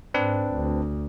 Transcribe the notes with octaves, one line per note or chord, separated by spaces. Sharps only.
G#2 C4 D4 B4
D2